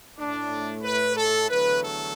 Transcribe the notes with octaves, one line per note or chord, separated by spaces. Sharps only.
A2 A3 D4
B4
A4
E2 D3 F#3 A3 B4
A4